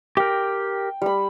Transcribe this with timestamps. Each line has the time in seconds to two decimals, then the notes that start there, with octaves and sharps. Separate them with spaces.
0.17 G4 A#4 G5
1.02 G3 B5